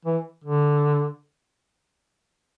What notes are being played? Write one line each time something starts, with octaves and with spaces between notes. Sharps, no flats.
E3
D3